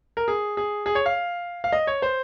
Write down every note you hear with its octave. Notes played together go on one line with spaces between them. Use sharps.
A#4
G#4
G#4
G#4
C#5
F5
F5
D#5
C#5
C5